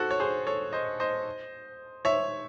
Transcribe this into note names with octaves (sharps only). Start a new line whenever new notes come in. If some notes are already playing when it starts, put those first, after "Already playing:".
Already playing: F#4 A4 C5
C#5
G#4 C5
A4 C#5
C5 D#5
C5 D#5
C#5 E5